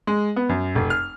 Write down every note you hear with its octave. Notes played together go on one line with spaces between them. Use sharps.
G#3
B3
F#2
F1
F6